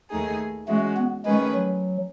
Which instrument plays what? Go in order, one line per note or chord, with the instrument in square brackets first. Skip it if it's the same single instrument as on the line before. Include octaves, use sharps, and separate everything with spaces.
[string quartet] D#2 D#3 A3 D#4 G#4
[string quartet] E3 G#3 C#4 F#4 [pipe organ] A3
[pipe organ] B3
[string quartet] D#3 A3 C#4 G#4 B4 [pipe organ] G#3
[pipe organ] F#3